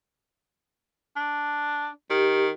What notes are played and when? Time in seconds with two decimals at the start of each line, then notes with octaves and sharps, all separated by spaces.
1.16 D4
2.10 D#3 G4